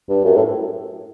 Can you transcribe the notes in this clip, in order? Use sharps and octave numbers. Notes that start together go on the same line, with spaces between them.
G2
F#2
A2